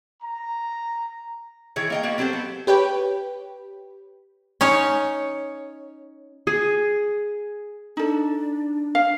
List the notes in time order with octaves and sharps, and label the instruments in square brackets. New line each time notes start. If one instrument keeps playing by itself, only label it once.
[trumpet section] A#5
[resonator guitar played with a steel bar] D#3 E3 G#4 C#5
A#3 D#5 G5
A#3 B3 F#4
F#3 C4 G4 A4 C5
B3
[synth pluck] G4 B4 C#5 G5
[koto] C#4 D#4 C#5
[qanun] G#4
[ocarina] D4 [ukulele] D#4 A4
[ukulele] F5